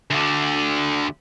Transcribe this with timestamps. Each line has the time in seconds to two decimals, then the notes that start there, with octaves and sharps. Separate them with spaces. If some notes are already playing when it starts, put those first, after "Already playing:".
0.10 D2 D3